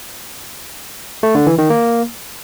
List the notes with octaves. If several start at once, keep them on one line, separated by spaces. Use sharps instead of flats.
A3
D3
E3
D#3
A#3